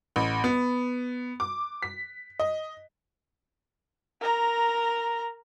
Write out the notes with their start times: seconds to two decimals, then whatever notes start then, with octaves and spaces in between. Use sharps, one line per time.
0.16 A1
0.44 B3
1.40 D6
1.83 B6
2.40 D#5
4.21 A#4 A#5